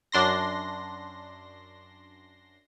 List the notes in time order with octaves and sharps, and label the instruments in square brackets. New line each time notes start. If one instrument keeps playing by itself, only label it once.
[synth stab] F#2 D4 C6 A#6